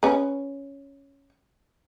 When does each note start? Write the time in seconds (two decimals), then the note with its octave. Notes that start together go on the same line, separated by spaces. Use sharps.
0.03 C#4 B4